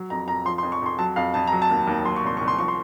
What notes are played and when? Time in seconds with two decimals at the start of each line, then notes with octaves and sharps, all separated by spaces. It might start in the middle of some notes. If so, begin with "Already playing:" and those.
Already playing: F#3
0.10 F2 A#5
0.28 F2 A#5
0.45 F3 C6
0.58 C6
0.63 F2
0.72 C#6
0.82 F2 C6
0.98 F#3 A5
1.16 F2 F5
1.34 F2 A5
1.47 F#3 A#5
1.62 A5
1.71 D#2
1.87 D#2
2.05 F#3 C6
2.16 C#6
2.23 C2 C6
2.37 C2 C#6
2.48 C6
2.58 F3 C#6
2.68 C6